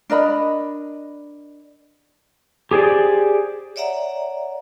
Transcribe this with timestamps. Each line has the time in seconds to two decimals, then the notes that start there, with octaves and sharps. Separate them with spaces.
0.10 D4 A#4 D#5 B5
2.71 G4 G#4 C5 D5
3.76 C#5 D5 E5 F#5 A#5